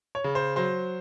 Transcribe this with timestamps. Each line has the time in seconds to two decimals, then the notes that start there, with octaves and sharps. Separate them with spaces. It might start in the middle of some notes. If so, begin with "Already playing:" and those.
0.15 C#5
0.24 C#3
0.35 C5
0.56 F#3 C5